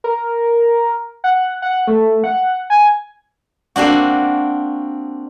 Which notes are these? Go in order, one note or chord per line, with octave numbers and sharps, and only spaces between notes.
A#4
F#5
F#5
A3
F#5
G#5
A#3 C4 D4 F#4